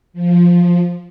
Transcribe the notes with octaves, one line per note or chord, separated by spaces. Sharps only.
F3